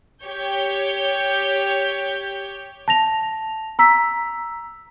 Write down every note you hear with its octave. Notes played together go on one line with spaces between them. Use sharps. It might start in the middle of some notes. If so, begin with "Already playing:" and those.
G4 C#5 G6
A5 A#6 F7
A#5 E6 B6